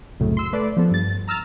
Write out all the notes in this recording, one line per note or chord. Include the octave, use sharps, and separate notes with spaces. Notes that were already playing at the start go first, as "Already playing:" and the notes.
C2 F#2 A2 C#3
C6 E6
A3 B4 D5
F3 B3 A4
G2 A6
A#5 E6 F6 A6